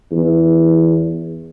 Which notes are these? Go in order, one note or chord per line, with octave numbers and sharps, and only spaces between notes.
E2